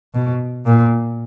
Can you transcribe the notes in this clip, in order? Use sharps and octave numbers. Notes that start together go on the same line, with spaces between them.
B2
A#2